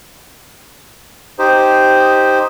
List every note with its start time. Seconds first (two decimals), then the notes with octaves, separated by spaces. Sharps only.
1.39 D#4 G4 C5